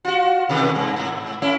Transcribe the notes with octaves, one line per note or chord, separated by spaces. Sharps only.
F4 F#4
B2 D#3 A3
G2
G#2
A3 C#4 E4